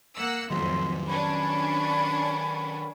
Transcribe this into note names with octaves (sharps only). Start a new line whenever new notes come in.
A#3 F#5 E6
F2 A2 D#3 F#3 C6
C#4 D4 B5